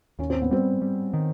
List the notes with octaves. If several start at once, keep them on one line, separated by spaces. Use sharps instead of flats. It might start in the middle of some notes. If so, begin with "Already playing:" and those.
D#2 C#4
C4
B3
G3 C4
G3
D#3